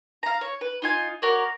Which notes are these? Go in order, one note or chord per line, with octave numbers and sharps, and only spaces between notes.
F5 A#5
C#5
B4
D#4 F4 G#5
F#4 A#4 C#5 D5